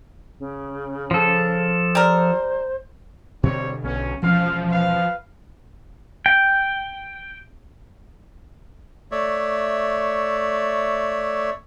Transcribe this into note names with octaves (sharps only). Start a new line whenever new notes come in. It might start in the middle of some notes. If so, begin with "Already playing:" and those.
C#3
F3 A4
G3 A#4 C5
B2 D3 G3 C4 C#5
B1 C#4
E1 F3 C#4 F5
B4 F5
G5
A3 C#5 D5 E5